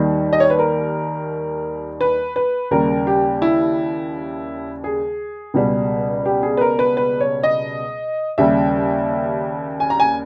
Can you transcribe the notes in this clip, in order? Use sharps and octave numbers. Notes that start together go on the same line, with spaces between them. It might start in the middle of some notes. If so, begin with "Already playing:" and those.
Already playing: D#2 D#3 G3
D#5
C#5
B4
A#4
B4
B4
D#2 C#3 G3 A#4
G4
E4
G#4
C#2 B2 G3
G4
G#4
B4
A#4
B4
B4
C#5
D#5
D#2 C#3 G3 E5
G#5
A#5
G#5